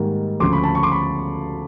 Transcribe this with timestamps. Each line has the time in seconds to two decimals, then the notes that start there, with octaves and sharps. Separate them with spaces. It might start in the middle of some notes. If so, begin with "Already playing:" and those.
Already playing: G#2 D#3 G3 A#3
0.40 D2 C#3 F3 C6 D6
0.52 B5 C#6
0.63 A5 B5
0.75 B5 C#6
0.83 C6 D6
0.92 B5 C#6